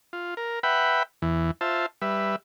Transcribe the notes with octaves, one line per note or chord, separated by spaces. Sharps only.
F4
A#4
B4 E5 F#5 G5 B5
E2 E3
F4 C5 E5 A5
G3 B4 E5